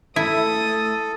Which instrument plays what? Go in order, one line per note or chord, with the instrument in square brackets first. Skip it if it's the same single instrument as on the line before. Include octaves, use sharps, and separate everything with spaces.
[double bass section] A3 [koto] E4 [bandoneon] A4 [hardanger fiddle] D#6